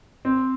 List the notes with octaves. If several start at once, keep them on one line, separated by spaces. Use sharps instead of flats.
C4